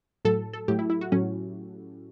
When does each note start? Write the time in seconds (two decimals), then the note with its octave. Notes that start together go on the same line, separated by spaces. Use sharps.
0.25 A2 F#3 A4
0.53 A4
0.68 A2 F#3 G4
0.79 E4
0.90 E4
1.01 F#4
1.12 A2 F#3 C#4